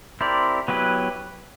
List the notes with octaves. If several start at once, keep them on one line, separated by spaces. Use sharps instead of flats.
C4 E4 G4 A#4 D5
F#3 B3 E4 G4 B4